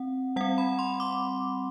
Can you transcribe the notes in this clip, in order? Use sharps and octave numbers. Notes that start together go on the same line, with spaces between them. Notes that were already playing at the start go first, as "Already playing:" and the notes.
Already playing: C4 F#5
G3 C4 F#5
B5
C6
D6